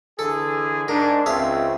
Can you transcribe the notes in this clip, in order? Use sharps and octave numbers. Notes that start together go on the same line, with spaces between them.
D3 E3 G#4 A4
G#2 D4 A#4
C#2 C4 G#4 E5 F5